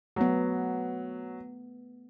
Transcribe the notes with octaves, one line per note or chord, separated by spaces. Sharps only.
F#3 A3 B3